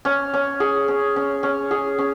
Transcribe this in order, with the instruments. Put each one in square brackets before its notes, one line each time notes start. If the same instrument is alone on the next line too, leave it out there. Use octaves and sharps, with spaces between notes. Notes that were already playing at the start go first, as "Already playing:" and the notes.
[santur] C#4
C#4
G#4
C#4
C#4
C#4
G#4
C#4